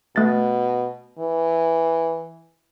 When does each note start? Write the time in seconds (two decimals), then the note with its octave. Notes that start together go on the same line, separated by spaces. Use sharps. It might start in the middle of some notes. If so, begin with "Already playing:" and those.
0.16 B2 A3 A6
1.19 E3